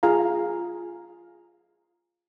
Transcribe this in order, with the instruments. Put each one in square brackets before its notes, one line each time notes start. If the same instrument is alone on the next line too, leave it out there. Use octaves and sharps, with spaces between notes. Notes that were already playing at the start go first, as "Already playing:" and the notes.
[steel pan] F4 G#4 F5 A#5